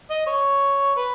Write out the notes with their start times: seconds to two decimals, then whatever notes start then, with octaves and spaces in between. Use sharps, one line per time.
0.10 D#5
0.27 C#5
0.96 B4